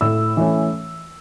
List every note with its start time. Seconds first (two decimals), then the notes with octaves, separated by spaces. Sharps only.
0.01 A2 E6
0.37 E3 A3 C#4